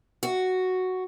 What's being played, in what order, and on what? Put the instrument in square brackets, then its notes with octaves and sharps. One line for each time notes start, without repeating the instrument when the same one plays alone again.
[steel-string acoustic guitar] F#4